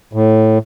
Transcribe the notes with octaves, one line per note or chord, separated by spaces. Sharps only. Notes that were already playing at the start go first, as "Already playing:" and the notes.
A2